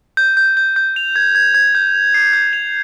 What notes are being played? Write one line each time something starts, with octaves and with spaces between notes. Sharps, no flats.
G6
G6
G6
G6
F7
G#6
G#6
G#6
G6
F7
C7
G6
F7